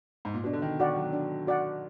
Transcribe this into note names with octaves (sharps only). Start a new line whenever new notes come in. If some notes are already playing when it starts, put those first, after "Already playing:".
G#2
A#2
B2 D4
D3
D#3
D#3 F#4 D5 F#5
F#3
D4
F#4 D5 F#5